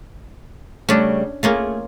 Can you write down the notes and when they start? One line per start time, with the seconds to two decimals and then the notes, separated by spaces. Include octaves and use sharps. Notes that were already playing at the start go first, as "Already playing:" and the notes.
0.89 C#3 G3 A3 C#4 D4
1.43 A3 A#3 C#4 F4 G#4